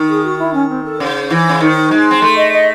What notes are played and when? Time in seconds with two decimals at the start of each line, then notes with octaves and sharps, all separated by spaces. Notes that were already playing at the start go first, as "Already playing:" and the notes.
Already playing: D#3
0.09 G#4
0.24 F#4
0.39 E4
0.54 C#4
0.69 C4
0.84 A4
1.00 C#3 C5
1.30 E3
1.49 C#3
1.61 D#3
1.91 G#3
2.11 C4
2.22 A3
2.36 D#5
2.53 D#5